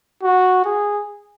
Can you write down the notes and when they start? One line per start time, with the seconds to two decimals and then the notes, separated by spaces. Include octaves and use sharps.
0.23 F#4
0.65 G#4